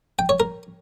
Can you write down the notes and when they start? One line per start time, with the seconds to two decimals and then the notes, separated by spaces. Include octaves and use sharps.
0.19 G5
0.29 C#5
0.40 A#4